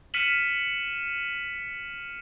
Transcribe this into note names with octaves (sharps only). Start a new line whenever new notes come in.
F6 B6 C#7 D#7 E7 F#7